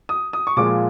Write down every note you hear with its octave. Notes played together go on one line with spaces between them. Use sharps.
D#6
D#6
C#6
A#2 F3 G#3 D6